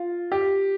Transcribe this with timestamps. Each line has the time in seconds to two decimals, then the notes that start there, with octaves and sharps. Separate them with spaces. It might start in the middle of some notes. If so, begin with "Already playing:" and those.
Already playing: F4
0.32 G4